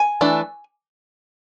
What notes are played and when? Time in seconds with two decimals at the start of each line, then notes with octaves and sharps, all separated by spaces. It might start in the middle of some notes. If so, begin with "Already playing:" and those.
Already playing: G#5
0.21 E3 A3 D4